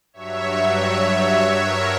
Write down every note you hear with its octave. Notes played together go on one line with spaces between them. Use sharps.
G2 F#3 C#5 E5
C#5 E5
A#4 C#5